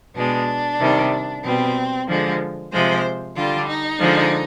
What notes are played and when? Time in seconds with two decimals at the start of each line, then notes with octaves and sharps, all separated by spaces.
0.15 B2 G#3 D4
0.79 C3 D#3 G3
1.43 B2 G3 C4
2.08 D3 F3 G#3
2.72 C3 F3 G#3 C5
3.35 D3 G3 F4
3.68 D#4
3.99 D3 F3 G#3